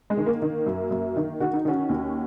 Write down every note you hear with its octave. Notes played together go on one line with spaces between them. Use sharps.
G#3
D#3
A#3
D#3
F#2
F#2
D#3
D#3 F#4
D#4
D#3 C#4 F#4
D#2